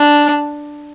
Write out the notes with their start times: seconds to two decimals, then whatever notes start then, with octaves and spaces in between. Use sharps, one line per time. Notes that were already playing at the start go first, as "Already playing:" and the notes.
Already playing: D4